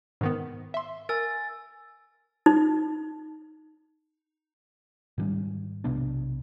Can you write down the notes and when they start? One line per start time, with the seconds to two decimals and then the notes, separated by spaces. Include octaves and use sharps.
0.21 G#2 D#3 B3
0.74 E5 C6
1.09 A#4 G#5 E6 A6
2.46 D#4
5.18 G#2 D#3 G3 C#4
5.84 B1 C3 B3 D4